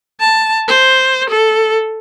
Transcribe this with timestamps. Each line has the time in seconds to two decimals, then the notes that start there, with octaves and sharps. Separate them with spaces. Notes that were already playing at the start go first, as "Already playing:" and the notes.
0.20 A5
0.68 C5
1.30 A4